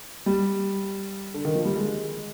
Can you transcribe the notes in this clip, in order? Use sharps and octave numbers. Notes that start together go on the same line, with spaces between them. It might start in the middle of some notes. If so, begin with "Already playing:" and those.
G3
D3
D#3
F3
G3
G#3